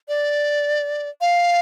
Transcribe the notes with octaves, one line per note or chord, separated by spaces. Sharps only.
D5
F5